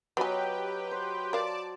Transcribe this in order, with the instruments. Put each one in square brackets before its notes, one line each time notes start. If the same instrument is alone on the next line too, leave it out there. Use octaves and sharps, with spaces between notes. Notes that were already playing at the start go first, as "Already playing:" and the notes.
[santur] F#3 F4 D#5 [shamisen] B3 G#5 [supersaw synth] G4 B4 G5
[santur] C5
[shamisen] A#4 F5 [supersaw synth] D5 A5 D6